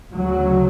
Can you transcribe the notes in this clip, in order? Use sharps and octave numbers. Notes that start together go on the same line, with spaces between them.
D2 C#3 F#3